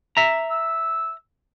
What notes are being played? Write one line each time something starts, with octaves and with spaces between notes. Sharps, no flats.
E5 A#5
E6